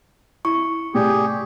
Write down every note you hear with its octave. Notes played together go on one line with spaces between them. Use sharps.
E4 C#6
A2 C3 G3 G4 G#4